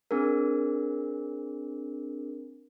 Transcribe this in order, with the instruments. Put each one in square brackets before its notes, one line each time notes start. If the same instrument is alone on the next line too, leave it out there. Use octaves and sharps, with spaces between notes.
[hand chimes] C4 D4 G#4 A#4